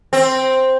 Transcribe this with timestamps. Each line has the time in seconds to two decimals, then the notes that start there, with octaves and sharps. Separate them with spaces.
0.13 C4